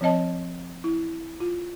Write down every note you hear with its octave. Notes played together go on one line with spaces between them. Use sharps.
F3 C4 C#5 D#5 A5
E4
F4